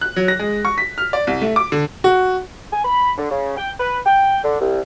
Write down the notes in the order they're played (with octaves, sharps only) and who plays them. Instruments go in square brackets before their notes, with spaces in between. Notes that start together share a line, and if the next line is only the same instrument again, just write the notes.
[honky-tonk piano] F#6
F#3
A#6
G#3
C#6
B6
F6
D5
C2
A3
D6
D3
[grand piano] F#4
[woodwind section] G#5
B5
D3
C#3
G5
B4
G5
D3
C2